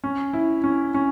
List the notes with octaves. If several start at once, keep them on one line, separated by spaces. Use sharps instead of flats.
C#4
E4
C#4
C#4